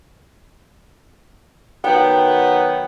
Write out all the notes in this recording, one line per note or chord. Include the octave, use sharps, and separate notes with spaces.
D#3 F#3 B3 G5